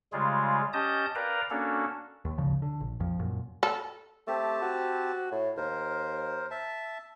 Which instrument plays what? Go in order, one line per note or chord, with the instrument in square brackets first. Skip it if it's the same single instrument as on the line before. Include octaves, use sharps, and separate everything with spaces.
[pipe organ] C#3 G3 G#3 F4 G#4
C#4 G4 D#5 A5 D#6 G6
A#4 B4 D5 F5 G5 A#5
A#3 C#4 D4 F#4 A4
[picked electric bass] D#2
G#1 D2 C#3 F3
D3
A#1
A#1 F2 F3
F#2 A#2
[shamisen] A4
[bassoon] A3 [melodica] C4 G4 A5
[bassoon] F#4
A2
[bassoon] D#2 [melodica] A#4 C5
[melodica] E5 A5